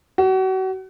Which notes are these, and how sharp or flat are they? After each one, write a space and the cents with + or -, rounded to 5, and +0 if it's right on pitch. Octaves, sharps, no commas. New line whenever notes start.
F#4 +35